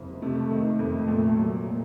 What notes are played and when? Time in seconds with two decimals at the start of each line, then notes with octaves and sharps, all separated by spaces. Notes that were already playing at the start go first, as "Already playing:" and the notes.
Already playing: F#1 F2
0.22 C3 A3
0.51 D#3
0.79 F2
1.08 A#2
1.36 F#3
1.65 A#2